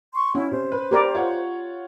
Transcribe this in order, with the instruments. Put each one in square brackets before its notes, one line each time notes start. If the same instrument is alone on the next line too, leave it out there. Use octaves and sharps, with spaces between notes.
[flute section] C6 C#6
[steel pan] C#4 [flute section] E4
[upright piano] C3 [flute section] C5
[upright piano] B4
[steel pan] G4 A#4 D5
[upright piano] F4 C#5 F#5